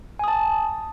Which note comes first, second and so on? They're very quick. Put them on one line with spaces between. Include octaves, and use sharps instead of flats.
G#5 D#6 A5